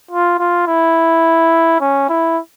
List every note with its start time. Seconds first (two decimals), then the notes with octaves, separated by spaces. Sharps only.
0.11 F4
0.39 F4
0.67 E4
1.81 C#4
2.09 E4